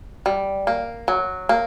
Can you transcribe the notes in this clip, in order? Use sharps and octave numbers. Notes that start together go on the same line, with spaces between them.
G3
A#3
F#3
A#3